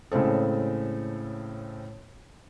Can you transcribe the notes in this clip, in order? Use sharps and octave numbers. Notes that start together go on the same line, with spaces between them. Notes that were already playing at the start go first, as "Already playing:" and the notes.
A2 C#3 G#3 C4 A4